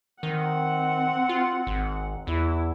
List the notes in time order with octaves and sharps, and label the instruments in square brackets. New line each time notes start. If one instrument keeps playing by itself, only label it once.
[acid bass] D#3 [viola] C4 F#5
[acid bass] F4
G#1
[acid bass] E2 [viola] E4